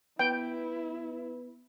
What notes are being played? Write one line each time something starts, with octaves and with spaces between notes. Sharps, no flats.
B3 E4 B4 G5